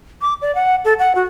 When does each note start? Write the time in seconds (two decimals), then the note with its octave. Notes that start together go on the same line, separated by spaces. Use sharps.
0.21 D6
0.42 D5
0.55 F#5
0.85 A4
0.99 F#5
1.15 F#4